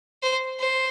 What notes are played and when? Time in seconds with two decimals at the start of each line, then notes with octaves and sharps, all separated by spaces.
0.23 C5
0.60 C5